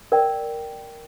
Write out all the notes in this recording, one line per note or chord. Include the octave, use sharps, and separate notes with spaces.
A#4 D5 G5